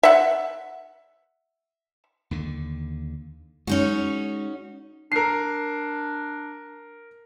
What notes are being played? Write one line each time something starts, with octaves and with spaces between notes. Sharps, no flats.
E5 F#5
D#2 D3
G#3 C#4 D#4 F#4
D4 A#4 C7